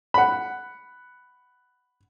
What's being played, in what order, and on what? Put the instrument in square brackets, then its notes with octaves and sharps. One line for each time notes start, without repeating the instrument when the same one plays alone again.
[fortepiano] F#5 B5